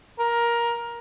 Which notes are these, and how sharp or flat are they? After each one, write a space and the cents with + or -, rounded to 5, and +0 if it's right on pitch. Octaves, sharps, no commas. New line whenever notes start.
A#4 +15